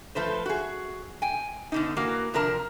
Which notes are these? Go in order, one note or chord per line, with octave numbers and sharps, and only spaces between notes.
F3 A3 B4 C5
F#4 G#4
G5 G#5
B2 D3 D#4
E3 A#3 F#4
C3 F3 D4 A#4 A5